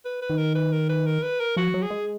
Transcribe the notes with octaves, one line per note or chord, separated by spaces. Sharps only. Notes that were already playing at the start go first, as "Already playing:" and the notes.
B4
B4
D#3
A#4
B4
A#4
B4
A#4
B4
A#4
F3 F#4
F#3
G#4
G#3